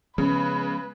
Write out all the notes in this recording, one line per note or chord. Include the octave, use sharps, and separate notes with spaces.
C#3 F3 G#3 B3 B4